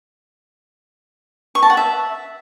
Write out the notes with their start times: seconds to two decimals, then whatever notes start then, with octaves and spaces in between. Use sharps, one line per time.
1.55 C#6
1.63 A5
1.70 F#5
1.77 E5